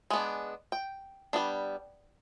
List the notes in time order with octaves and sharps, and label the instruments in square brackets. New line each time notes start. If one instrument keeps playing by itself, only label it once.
[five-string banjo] G#3 B3 D4 G#5
G5
G3 B3 D4